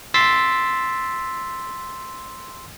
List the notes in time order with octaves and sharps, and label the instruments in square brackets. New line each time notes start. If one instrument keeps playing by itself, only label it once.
[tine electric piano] C6 E6 A6 B6